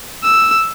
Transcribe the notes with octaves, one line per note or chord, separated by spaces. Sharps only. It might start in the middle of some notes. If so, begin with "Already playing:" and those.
E6